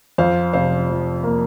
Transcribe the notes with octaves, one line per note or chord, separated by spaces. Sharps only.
F2 C5 F5
F1 C5 F5
F3
A#3